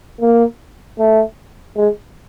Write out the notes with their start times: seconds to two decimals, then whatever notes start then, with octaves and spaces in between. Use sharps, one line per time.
0.21 A#3
0.98 A3
1.76 G#3